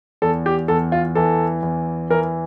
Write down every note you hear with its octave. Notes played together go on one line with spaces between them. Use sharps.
E2 A4
G4
E2 A4
F4
E3 A4
E2
E3 A#4